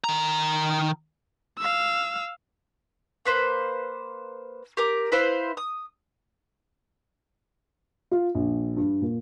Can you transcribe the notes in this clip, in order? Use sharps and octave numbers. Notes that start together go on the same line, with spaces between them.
D#3 A#5
F5 E6
A#3 B4 C5
G4 A#4 D6
E4 B4 C5 F5
D#6
F4
A#1
G2
A#2